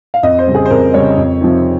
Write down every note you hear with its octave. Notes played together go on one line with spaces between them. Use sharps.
F5
F2 D#5
C5
C#3 G3
G#4
C5
F2 A#4
C#3 G3 C#5
F2
C3 F3 C4 D#4